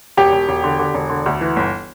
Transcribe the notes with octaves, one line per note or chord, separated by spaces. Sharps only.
E1 G4
E1
E1
D3
D3
E1
D3
D2
E3
G1